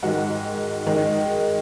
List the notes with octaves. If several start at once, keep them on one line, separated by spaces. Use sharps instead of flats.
G#2 D#3 G#3 F#4
D#3 G#3